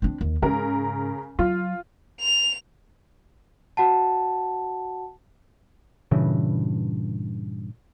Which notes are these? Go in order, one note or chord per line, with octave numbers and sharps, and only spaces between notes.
C4 D4
D#2
G#2 C#3 A#4
F#3 F4
F7
F#4 F#5 A5
G2 A#2 C#3 E3